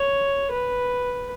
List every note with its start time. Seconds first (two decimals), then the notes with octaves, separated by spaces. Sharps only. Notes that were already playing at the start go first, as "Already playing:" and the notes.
Already playing: C#5
0.52 B4